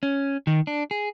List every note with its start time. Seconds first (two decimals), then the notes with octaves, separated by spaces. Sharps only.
0.03 C#4
0.47 D#3
0.67 D4
0.91 G#4